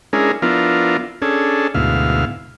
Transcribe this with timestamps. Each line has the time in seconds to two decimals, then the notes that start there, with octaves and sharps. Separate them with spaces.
0.13 G#3 C#4 D4 E4 G#4 A#4
0.42 F3 B3 D4 E4 F4 A#4
1.22 C#4 D4 G#4 A4
1.75 D2 G#2 B2 E4 F5